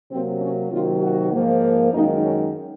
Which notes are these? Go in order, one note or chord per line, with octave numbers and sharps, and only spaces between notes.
C3 F#3 A#3 C4
C#4
C3 D#3 F#3 A#3 F4
F#4
G#2 F3 A#3
F#2 D#3 G#3 D#4
C#4